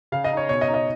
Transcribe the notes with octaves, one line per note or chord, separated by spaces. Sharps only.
C#3 F5
D#5
D#4
C#5
B2 C#5
D#5
D#4
D#5